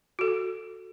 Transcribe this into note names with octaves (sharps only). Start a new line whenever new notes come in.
F#4 A4